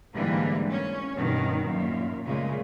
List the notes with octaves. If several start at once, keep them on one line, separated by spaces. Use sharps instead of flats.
G#2 D3 E3 G3 A#3
C#4
G2 B2 D#3
F#2 A#2
A#2 C#3 G#3 A3